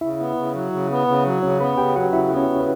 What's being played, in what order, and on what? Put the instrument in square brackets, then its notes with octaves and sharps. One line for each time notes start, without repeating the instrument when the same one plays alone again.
[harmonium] C#3 [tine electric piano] E4 E5
[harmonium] B3
C#3
F#3
C#3
B3
C#3
F#3
[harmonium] C#3 [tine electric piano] C#4 C#5
[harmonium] B3 [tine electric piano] B4 B5
[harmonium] C#3 [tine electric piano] G4 G5
[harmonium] F#3 [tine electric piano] F#4 F#5
[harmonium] C#3 [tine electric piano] E4 E5
[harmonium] B3
[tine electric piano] C#4 C#5
[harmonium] C#3
[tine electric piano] B4